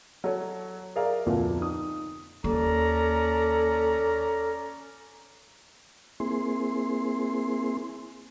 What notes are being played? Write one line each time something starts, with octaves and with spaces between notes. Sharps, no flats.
F#3 A4 C#5
G#4 A#4 D5 E5 F5 A#5
F1 D2 A#2 F3 B3
D#4 D#6
D#2 C#4 A4 D5 A#5
A#3 C4 E4 G#4 C6